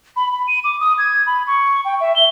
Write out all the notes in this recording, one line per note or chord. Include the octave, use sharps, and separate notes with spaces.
B5
B5
D#7
D6
D#6
G#6
B5
C#6
G5
E5
G7